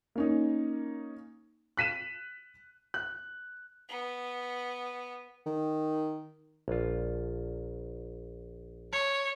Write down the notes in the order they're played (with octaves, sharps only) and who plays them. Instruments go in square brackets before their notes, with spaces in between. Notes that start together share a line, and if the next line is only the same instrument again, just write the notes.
[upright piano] A#3 C#4 D#4
F#6 B6 D#7 E7
[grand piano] F#6
[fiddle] B3
[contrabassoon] D#3
[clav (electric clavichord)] A#1 F4
[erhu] C#5